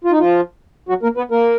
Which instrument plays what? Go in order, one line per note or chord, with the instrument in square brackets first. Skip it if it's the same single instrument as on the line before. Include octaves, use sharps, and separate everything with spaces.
[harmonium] F4
D#4
F3 F4
F#3 F#4
A#3 A#4
B3 B4
A#3 A#4